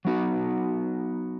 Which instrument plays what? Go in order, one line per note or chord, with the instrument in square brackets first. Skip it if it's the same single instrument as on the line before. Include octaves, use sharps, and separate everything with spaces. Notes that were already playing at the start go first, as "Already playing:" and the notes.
[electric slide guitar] F#3 B3 D#4 F#4